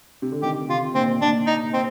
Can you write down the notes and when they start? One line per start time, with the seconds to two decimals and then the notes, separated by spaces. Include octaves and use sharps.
0.22 C3
0.32 D3
0.42 C3 D#3 G4
0.69 C3 F4
0.95 A#2 C4
1.21 A#2 D4
1.47 D#4
1.73 C4